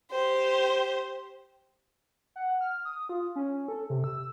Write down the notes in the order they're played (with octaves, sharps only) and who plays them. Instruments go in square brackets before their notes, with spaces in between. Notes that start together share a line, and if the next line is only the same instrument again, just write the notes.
[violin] G4 C5
[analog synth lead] F#5
F6
D#6
F4
C#4
A4
C3
E6